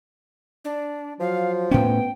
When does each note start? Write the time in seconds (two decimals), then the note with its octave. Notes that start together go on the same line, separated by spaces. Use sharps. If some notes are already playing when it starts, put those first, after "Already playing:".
0.65 D4
1.20 F3 F#3 F5
1.71 A2 B3 C#4 G5